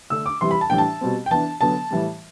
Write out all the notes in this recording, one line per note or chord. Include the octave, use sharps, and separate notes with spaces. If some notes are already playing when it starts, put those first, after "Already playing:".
D3 A3 D4 E6
D6
C3 E3 G3 C6
B5
A5
A2 E3 G3 D4 G5
A5
B2 G3 C4
G5
E3 B3 D4 A5
D3 F#3 B3 A5
A2 E3 G3